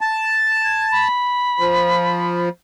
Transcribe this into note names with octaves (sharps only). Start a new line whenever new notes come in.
A5
G#6
B5
F3